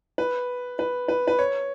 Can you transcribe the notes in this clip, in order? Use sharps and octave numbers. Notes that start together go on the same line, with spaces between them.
B4
B4
B4
B4
C#5